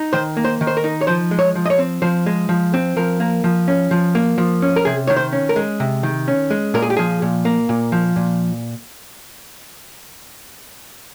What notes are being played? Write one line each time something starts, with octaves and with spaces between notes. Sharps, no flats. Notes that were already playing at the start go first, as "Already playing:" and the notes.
Already playing: D#4
D#3 C5
A#3
C5
D#3
C5
A#4
D#4
C#5
F3 C5
G#3
C#5
F3
D#5
C#5
C4
F3 C5
G#3
F3
C4
F3 A#4
A#3
F3
C#4
F3
A#3
F3
C#4
A#4
C3 G#4
D#3 C#5
C5
C#4
A#4
G#3
C3
D#3
C#4
G#3
A#2 A#4
G#4
G4
F3 G#4
A#2
A#3
A#2
F3
A#2